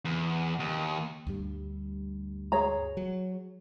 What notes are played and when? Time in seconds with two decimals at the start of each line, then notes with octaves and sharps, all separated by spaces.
0.05 E2
0.60 D#2
1.27 D2 G2 G3
2.52 G#4 C#5 A#5
2.97 F#3